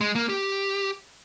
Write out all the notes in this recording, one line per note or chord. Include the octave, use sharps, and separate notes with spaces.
G#3
A#3
G4